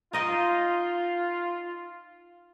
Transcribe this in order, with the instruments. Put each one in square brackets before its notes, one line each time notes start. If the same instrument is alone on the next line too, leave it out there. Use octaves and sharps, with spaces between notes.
[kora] D#4 D#5 G5 [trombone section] F4